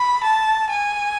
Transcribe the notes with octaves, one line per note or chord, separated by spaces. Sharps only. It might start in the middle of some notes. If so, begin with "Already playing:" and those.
Already playing: B5
A5
G#5